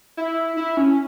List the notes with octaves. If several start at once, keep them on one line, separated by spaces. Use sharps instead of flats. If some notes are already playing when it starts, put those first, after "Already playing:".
E4
E4
C#4